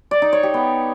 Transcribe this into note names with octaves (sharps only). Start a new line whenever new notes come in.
D5
D#4
C#5
G4
B3